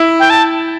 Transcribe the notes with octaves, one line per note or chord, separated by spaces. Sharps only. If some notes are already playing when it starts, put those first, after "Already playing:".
Already playing: E4
G5
A5